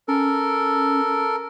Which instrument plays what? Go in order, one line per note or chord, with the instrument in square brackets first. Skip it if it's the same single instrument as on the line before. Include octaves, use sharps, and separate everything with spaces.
[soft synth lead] C#4 [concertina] A4 A#4